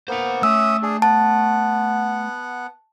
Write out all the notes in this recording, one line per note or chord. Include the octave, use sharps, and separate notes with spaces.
A#3 B3 C5 F#5
A3 C#4 E5 D#6 E6
D4 G#4
B3 F#5 A5